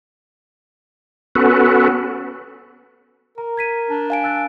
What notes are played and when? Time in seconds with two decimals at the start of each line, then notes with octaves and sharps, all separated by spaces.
1.35 B3 C#4 F#4 A4 B4
3.38 A#4 A#5
3.57 G#6 B6 D#7
3.90 D4 A5
4.10 F5 G#5 D7
4.24 E6 F#6 A6